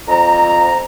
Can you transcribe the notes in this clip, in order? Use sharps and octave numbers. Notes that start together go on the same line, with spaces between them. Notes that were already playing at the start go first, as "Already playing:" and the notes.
F2 A#5